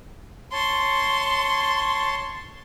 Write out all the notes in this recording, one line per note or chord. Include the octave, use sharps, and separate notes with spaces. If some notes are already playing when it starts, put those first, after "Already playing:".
C#5 A5 C6